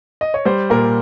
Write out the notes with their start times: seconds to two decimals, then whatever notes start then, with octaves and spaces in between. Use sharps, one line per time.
0.21 D#5
0.34 C#5
0.45 G3 C5
0.70 A#2 A#4